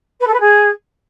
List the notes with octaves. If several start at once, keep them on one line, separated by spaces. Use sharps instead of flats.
B4
A4
B4
G#4